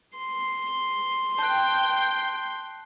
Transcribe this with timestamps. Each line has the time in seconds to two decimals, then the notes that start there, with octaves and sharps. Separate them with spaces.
0.17 C6
1.39 G5 A5 F#6 G6